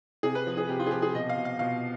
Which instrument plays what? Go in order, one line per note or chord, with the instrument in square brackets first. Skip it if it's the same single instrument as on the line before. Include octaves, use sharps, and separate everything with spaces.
[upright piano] C3 G#4
B4
F3
G#4
C3 G4
F4
G#4
F3 G4
G#4
B2 D#5
F5
B2
F5
B2 F5